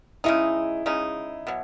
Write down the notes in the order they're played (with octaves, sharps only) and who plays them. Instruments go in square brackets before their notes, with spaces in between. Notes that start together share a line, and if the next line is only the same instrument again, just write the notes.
[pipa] C#3 G#3 D#4 [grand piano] E4
[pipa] C#3 G#3 D#4
B2 F#3